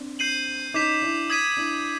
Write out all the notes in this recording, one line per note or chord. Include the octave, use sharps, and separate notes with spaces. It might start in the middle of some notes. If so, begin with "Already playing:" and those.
Already playing: C4 D4
G6 C7 D#7 F#7
C#4 D#4 D6 G6 B6 E7
D4 E4
D#6 G#6 B6 D#7
D4 E4